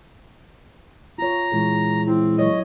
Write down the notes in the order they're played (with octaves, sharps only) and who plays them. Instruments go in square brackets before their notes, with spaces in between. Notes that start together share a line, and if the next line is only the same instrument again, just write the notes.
[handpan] F4 C#5 [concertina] A#5
[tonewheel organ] A#2 E3 G#3
[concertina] C4 [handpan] E4
[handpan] F#3 C#5 [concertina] D#5